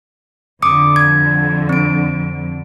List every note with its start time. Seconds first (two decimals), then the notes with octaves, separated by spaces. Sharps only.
0.62 F2 D3 D6 D#6 C#7
0.96 G#6
1.69 C4 D7